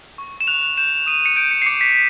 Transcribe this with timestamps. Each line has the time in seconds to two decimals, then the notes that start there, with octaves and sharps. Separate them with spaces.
0.18 C#6
0.41 E7
0.47 F#6 F7
0.77 G6 E7
1.07 D#6 D#7
1.26 C#7
1.36 G6 D7
1.51 C#7
1.62 C7
1.66 D6 C#7
1.81 B6